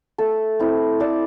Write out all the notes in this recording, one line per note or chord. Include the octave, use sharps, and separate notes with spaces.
A3 A4
C4 E4
A3 A4 D5